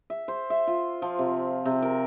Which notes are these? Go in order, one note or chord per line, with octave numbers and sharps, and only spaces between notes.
E5
C5
E5
F4
F3
C3
C3
A#4